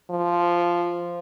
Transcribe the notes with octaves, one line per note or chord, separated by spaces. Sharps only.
F3